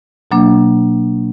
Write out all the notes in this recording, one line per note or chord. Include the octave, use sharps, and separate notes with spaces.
B2 F#3 A#3 D4